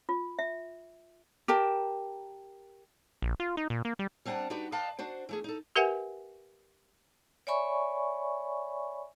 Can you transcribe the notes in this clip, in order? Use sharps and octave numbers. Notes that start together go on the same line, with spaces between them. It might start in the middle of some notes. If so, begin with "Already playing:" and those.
F4
E5
G4 A#4 A5
A#1
F4
D#4
A#2
A#3
G3
G3 C4 D4 F#5 A5 A#5
D4 D#4 F#4 G4 B4
B4 D5 D#5 F5 G5 A5
D4 F#4 C5
E3 A3 G#4
D#4 A4
G4 A#4 B4 E5 F#5 G#5
C#5 D5 E5 G#5 B5 C#6